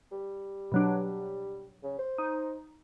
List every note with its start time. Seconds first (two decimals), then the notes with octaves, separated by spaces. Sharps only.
0.12 G3
0.72 B2 F#3 D4
1.83 C#3
1.98 C5
2.18 D#4